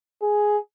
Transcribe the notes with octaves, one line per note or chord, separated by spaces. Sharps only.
G#4